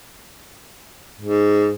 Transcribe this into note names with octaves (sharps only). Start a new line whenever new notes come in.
G#2